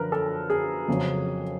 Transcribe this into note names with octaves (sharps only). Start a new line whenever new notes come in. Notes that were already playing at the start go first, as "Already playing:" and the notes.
Already playing: F#2 D3 F3 A#4 B4
A4
G#4
F2 C#3 F#3